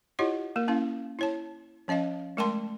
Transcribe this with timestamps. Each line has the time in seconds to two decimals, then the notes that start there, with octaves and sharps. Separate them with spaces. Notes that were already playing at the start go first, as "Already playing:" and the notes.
0.19 E4 F4 G4 C#5 D#5 F#5
0.56 A#3 A#4
0.68 A#3 C#4 E4 F5
1.19 E4 C#5 A5
1.88 F3 C#4 D#5 F5 A5
2.37 G#3 A3 A#4 G5 A5 C6